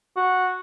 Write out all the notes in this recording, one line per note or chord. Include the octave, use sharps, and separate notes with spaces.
F#4